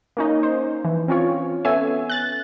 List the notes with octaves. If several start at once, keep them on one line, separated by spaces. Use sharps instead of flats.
A#3 C#4 D#4
C5
E3
C4 C#4 F4 C#5
B3 C#4 A4 E5 G#5
F#6 A6